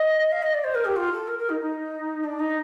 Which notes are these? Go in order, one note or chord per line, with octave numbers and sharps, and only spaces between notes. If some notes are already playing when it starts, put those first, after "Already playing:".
Already playing: D#5
F5
D#5
D5
C5
A#4
G4
F4
A4
A#4
A#4
D#4
D#4
D4
D#4